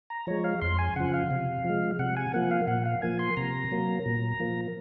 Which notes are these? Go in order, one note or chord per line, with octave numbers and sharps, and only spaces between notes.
A#5
F3 G#3 C#5
F5
F2 C6
G#5
C#3 F3 F#5
F5
C3
F3 G#3
C3 F#5
G#5
F3 A#3 F#5
F5
A#2 F#5
F5
F3 A#3 G#5
C6
C3 A#5
F#3 A#3
A#2
F3 A#3